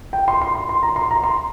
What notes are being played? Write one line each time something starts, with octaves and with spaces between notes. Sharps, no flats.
G5
C6
C6
C6
C6
A#5
C6
A#5
C6